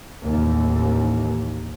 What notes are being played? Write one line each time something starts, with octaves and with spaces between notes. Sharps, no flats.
A1 D#2